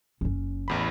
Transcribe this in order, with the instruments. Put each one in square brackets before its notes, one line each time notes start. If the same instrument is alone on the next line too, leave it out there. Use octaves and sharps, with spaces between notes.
[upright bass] F#1 C#4
[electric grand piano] A1 E2 B5